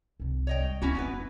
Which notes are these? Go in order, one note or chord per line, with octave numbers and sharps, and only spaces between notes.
C2 C3
C#5 D#5 G5
G3
D2 A#3 C#4 E4 F#4
F1 G2 B3 E4 B4